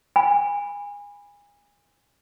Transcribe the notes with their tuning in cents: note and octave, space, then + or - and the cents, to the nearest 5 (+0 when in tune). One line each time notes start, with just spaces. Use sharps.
G#5 -25 B5 +0